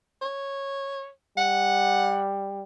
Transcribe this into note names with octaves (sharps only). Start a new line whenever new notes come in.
C#5
G3 F#5